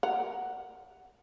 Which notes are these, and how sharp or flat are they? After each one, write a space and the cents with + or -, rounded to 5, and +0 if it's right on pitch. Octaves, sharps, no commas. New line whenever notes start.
A#4 +20 F#5 +0 A#5 +0